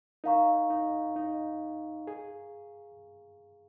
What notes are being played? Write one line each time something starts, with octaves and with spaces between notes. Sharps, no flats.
D#4 A#4 F5 A#5 C#6
D#4
D#4
G#4